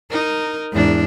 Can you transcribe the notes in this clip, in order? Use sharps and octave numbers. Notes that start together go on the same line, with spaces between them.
D#4 A#4
E2 G#2 D4